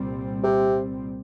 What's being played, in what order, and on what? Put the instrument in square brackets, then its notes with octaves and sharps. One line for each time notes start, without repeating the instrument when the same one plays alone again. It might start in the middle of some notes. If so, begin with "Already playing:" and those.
Already playing: [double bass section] C2 A#2 G3 C4
[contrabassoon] C3